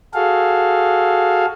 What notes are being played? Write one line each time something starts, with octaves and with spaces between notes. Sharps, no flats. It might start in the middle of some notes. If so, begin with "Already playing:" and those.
F#4 G#4 A4 F5